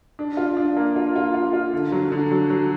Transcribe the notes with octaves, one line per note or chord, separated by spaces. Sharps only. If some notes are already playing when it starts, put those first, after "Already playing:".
D4
F4
D4
A#3
F4
F4
F4
F4
D3
F#3
D3
F#3
F#3